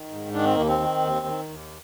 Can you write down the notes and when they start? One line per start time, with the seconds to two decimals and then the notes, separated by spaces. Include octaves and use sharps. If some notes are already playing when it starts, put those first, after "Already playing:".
Already playing: D#3
0.10 G#2
0.33 D#3 D4
0.44 C4
0.56 D#2 A#3
0.68 C4
0.80 D#3
1.02 D#2
1.26 D#3
1.49 D#2